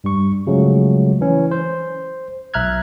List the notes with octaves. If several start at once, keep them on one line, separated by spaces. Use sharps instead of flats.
G2 G3 C#6
C#3 F3 F#3 G#3 A3
E3 C#4
C5
B1 E5 A#5 F6 F#6 G#6